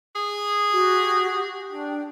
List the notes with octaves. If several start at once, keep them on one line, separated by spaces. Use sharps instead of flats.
G#4
F#4 G4
D4 G5